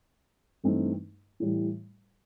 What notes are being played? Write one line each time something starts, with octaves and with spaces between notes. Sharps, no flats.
G2 E3 A3 C4 D#4
A2 E3 G3